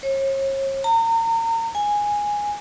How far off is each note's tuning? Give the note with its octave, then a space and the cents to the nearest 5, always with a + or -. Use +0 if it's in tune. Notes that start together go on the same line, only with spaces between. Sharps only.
C#5 -40
A#5 -35
G#5 -5